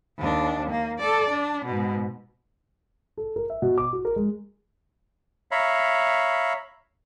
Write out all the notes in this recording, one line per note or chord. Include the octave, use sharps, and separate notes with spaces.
D#2 D4
A#3
A4 D5
D4
G#2 B2
A4
A#4
E5
B2
D6
F#4
A#4
G#3
C#5 E5 F5 A#5 B5